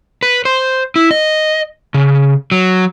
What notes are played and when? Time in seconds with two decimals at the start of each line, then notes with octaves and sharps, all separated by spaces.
0.23 B4
0.45 C5
0.96 E4
1.11 D#5
1.94 C#3
2.52 F#3